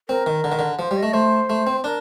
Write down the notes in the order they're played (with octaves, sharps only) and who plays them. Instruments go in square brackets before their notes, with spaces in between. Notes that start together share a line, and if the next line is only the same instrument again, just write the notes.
[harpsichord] C4 [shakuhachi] A#4
[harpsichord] D#3
D3
D#3
D3
[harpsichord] F3 [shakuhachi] C5
[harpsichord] G3
[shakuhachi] D#5
[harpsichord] A3
[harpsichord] A3 [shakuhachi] C5
[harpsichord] A3
C4
[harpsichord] D4 [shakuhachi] A#4